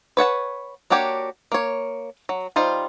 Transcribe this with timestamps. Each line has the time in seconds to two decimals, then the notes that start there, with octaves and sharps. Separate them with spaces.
0.17 B4 C#5 F#5 A5
0.90 A#3 D4 F#4 G4 C#5
1.52 A#3 C#5
2.29 F#3
2.56 G3 D#4 F4 C5